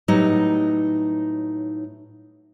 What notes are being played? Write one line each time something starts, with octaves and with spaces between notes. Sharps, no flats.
A2 F#3 G3 B3 D#4 D#5